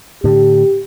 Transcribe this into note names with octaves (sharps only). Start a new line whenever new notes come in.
A2 D3 G4